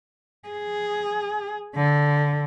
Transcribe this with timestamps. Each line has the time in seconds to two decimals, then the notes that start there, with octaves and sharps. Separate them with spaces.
0.49 G#4
1.75 D3